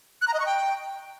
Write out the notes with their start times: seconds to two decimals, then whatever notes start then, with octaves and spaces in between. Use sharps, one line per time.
0.21 F#6
0.28 A#5
0.34 D#5
0.40 C#6
0.46 G5